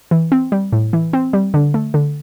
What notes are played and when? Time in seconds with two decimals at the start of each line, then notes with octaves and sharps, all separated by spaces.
0.11 E3
0.32 C4
0.52 G3
0.73 A2
0.93 E3
1.13 C4
1.33 G3
1.54 D3
1.74 A3
1.94 D3